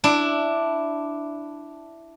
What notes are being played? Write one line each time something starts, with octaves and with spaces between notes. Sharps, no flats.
D4 E4